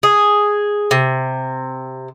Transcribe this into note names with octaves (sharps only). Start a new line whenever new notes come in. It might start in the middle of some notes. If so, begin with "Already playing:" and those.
G#4
C3